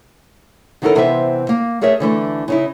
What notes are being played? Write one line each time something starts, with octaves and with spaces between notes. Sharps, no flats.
D#3 F#3 D#4 E4 A4 A#4
C3 E3 B3 C4 D#5 E5
A#3
A3 G#4 A#4 C#5 E5
D3 E3 A3
C#3 D#4 E4